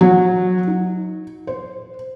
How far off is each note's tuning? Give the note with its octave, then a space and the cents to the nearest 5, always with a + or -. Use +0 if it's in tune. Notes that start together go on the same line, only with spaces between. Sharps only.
F#3 -20
D#4 +20
C5 -10